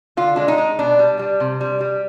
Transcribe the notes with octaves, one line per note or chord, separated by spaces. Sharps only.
D3 F4
G#3 D4
D#4
G#3
B2 D4
G3
G3
C3
G3
G3